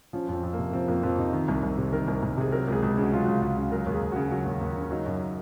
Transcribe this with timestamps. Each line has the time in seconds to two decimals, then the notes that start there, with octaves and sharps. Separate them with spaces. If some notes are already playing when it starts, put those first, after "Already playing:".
0.13 F3 C#4
0.28 F2 C4
0.43 F2
0.53 A#3
0.59 C3
0.73 F3 C4
0.88 F2 A#3
1.03 F2 C4
1.18 C3 D#4
1.33 D#3
1.48 C2
1.63 C2
1.78 C3
1.92 D#3 A#4
2.08 C2
2.22 C2
2.37 C3 G#4
2.52 F#3 A#4
2.68 C#2 G#4
2.82 C#2
2.92 G#4
2.97 C#3
3.03 F#4
3.12 F#3 F4
3.24 C#2 F#4
3.42 C#2
3.57 C#3
3.72 F#3 A#4
3.86 D#2
3.92 G#4
4.01 D#2
4.12 C#3 F#4
4.31 F#3
4.46 D#2
4.61 D#2
4.76 C#3
4.82 C#4
4.91 F#3 D#4
5.06 F#2